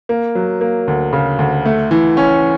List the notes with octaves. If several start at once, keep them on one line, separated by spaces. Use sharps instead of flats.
A#3
F#3
A#3
D2
C#3
D2
A3
E3
C#4